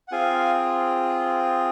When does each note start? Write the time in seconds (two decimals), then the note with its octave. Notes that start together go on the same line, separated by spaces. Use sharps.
0.08 F#5
0.12 C4 F4 G#4 F5 G#5